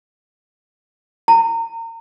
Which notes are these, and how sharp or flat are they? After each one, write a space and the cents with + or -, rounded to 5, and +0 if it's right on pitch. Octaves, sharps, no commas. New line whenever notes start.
A#5 -30